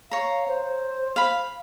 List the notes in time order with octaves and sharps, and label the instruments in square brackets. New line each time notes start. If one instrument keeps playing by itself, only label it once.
[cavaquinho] C#5 A#5 [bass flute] F5
[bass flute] C5
[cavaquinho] F5 B5